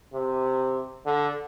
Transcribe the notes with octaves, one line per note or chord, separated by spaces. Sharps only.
C3
D3